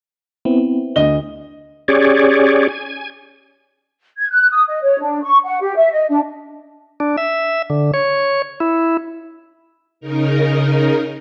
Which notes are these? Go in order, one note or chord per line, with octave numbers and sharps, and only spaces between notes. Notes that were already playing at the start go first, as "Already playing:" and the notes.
B3 C4 E4
D2 D#5 G7
C#4 G4 G#4 C#5 D5
G#5
G#6
F#6
D#6
D#5
C#5
D4
C#6
F#5
G4
E5
D#5
D4
D4
E5
D3
C#5
E4
C#3 D#4 A#4